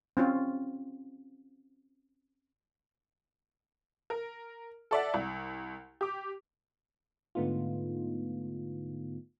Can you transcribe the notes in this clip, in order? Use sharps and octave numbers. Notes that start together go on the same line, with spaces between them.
C4 C#4 F4
A#4
A4 D5 E5 F#5
C2
G4 D6
G#2 D3 A3 B3 D#4 F4